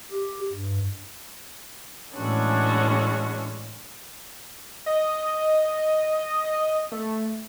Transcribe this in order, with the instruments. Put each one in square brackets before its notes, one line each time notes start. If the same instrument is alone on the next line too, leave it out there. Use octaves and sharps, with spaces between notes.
[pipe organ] G4
G2
[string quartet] A2 E3 G#3 C#4 D4 F#4
[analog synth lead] D#5
A3